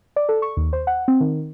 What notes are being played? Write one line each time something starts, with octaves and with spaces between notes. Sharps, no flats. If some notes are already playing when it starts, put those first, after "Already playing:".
D5
A4
C#6
D#2
C5
F#5
C4
D#3